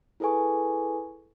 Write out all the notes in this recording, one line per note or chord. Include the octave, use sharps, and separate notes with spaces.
E4 G#4 A4 B4 G#5 C#6